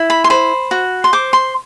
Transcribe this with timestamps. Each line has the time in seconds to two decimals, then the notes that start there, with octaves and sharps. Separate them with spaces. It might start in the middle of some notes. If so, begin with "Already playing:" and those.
Already playing: E4
0.10 B5
0.24 C6
0.30 C5 B5
0.71 F#4
1.04 C6
1.13 C5 D6
1.33 C6